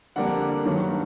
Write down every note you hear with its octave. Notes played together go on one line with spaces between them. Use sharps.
F2 D3 G3 A#3 D4 F#5
G2 D#3 F#3